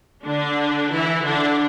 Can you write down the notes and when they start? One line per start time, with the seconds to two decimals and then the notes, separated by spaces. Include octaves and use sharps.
0.25 D3 D4
0.91 E3 E4
1.25 D3 D4